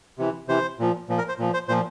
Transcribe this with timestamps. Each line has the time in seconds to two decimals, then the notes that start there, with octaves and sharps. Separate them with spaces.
0.18 C3 E3
0.48 C3 E3 C5
0.79 A#2 F3
1.09 A#2 F3
1.18 A#4
1.29 C5
1.38 A#2 F3
1.54 C5
1.68 A#2 F3 C5